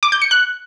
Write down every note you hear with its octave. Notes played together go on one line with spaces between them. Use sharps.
D6
G6
C#7
F#6